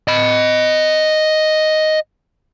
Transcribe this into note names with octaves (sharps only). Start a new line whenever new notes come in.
D#5 B5